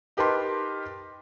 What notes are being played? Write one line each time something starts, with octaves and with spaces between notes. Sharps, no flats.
D#4 G4 A#4 B4 A5 C6